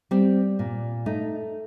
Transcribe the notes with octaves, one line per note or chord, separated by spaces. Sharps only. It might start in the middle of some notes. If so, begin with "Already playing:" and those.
G3 C4
A#2
A3 D#4